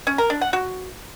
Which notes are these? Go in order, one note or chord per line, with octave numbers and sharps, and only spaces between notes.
C#4
A#4
D4
F#5
F#4